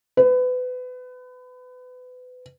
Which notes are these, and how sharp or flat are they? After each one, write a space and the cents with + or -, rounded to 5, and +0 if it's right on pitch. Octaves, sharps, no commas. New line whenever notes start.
B4 +30